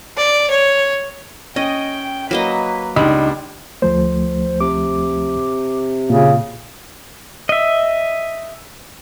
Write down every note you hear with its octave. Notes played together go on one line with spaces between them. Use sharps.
D5
C#5
C#4 D#5 G5
F#3 A#3 B4 D#5
C#2 G3 D4 D#4 D#5 B5
D2 F3 A3 C5
C3 D6
A#2 C#3 F4
D#5 E5